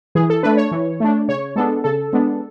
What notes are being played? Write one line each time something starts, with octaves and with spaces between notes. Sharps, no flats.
E3 G#4
A4
A3 D4 B4
C#5
E3
A3 D4
C#3 C#5
G#3 B3 D4 A4
C#3 A4
G#3 B3 D4